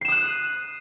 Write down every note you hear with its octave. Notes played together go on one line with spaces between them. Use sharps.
D#6 F#6 C7 E7